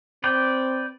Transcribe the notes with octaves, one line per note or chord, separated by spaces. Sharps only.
C4 B4 D5 G5